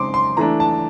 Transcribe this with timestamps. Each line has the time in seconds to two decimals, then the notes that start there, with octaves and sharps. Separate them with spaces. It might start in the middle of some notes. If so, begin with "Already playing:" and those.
Already playing: C#3 G#3 C4 D#4 C6 D6
0.14 C6
0.37 E3 A3 D4 A#5
0.60 A5